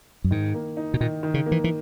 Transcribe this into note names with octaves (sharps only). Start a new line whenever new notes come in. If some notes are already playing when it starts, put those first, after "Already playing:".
F#2
G#2 D#3
A#3
D#4
B2
A#2 D#3
D#3
C#3
A#3
E3
E3